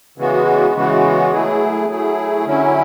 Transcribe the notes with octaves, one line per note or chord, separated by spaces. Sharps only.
C#3 E3 G#3 B3 F#4
C#3 E3 G#3 B3 F#4
F#3 A3 E4 G#4
F#3 A3 E4 G#4
D3 F#3 C#4 E4